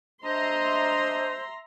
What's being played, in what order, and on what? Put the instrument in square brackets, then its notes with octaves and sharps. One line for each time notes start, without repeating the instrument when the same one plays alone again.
[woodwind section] D4 D#5 [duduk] C5 [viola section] E5 A#5 C6